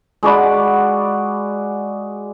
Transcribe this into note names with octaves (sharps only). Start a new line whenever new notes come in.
G#3 F#4 D5 B5